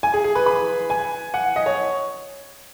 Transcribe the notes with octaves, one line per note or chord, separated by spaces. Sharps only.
G#5
G#4
G#4
B4
B5
G#5
F#5
D#5
C#5